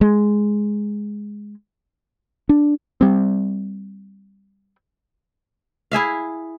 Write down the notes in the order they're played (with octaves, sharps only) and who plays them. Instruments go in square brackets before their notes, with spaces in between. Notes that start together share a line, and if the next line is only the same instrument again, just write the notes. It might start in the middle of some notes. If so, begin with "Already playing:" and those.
[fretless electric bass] G#3
D4
[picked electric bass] G3 C4
[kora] E4 G#4 E5 F5